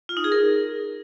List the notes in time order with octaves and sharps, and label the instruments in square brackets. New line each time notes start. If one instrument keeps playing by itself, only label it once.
[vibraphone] F4
D#4
G#4
A#4